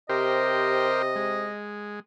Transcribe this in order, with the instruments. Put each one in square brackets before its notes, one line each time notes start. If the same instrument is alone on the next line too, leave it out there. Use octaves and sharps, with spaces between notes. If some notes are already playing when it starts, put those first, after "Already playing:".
[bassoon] C3 [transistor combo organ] G4 A#4 C5 [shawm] D#5
[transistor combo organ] G#3